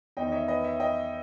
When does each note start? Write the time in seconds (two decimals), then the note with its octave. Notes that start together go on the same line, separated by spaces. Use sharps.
0.17 E2 D#3 D#5 G5
0.28 D#5
0.32 C#5 E5
0.48 B4 D#5
0.64 C#5 E5
0.80 D#5 G5